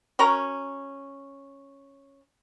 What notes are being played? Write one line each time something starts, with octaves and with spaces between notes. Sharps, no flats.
C#4 F#4 A#4 A#5